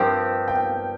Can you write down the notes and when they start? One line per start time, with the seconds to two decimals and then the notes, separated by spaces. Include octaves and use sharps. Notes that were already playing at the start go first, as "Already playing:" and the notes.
Already playing: G2 F3 C4 G4 A#4
0.48 G5